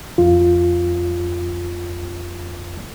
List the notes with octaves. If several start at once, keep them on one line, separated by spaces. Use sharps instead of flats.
F2 F4